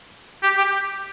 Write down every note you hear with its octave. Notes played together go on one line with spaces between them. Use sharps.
G4
G4